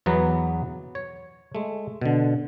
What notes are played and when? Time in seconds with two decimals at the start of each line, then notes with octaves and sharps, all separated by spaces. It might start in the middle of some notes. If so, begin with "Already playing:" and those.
0.06 E2 E3 F#3 B3 B4 A#5
0.95 C#5
1.55 G#3 A3
2.01 B2 D3